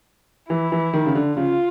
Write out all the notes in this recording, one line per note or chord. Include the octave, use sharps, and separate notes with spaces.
E3 E4
E3
D#3
C#3
D3
C#3 F4